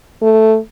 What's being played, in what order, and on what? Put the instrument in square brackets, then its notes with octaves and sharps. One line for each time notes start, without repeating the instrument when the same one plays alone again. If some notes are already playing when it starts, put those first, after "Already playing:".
[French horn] A3